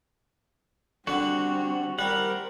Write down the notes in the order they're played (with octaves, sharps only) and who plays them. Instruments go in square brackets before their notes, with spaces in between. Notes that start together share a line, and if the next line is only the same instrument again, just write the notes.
[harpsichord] D3 [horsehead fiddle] G3 C4 [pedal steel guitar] F#4
[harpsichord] G3 [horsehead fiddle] A#4 C5 [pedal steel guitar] F#5